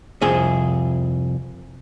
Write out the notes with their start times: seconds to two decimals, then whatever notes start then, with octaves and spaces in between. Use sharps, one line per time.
0.21 C2 F2 G#4 E5